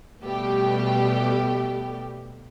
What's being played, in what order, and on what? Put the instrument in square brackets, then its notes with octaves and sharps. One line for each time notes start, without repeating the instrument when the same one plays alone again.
[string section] B2 G3 A3 B3 G4